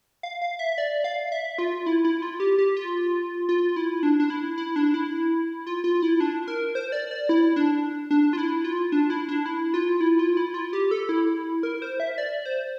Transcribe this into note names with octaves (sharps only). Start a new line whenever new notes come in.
F5
F5
E5
D5
F5
E5
F4
E4
E4
F4
G4
G4
F4
F4
E4
D4
D4
E4
E4
D4
E4
F4
F4
E4
D4
A#4
C5
D5
D5
E4
D4
D4
F4
E4
F4
D4
E4
D4
E4
F4
E4
F4
E4
F4
G4
A4
E4
A#4
C5
E5
D5
C5